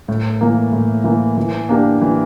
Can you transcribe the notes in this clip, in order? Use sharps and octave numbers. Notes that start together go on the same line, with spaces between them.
A2
E3 A#3
A2
E3 A#3
E3
A#3 D4 G4
E3